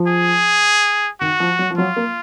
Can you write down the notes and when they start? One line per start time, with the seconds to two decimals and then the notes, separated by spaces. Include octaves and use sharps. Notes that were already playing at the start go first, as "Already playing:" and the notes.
Already playing: F3
0.08 G#4
1.21 D#3 F#4
1.40 F3
1.59 F#3
1.71 F3
1.78 F#3 F4
1.96 A#3